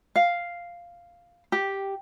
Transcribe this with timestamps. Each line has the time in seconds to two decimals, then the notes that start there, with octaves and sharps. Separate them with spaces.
0.16 F5
1.52 G4